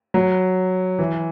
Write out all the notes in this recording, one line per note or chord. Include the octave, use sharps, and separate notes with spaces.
F#3
E3